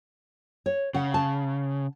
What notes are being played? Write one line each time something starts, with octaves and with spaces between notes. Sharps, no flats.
C#5
C#3 F#5
A5